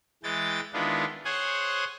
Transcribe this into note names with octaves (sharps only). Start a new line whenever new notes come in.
E3 G#3 G5 A6
D#3 G#3 B3 D4 E4 F4
G#4 C5 C#5 F#5 G#5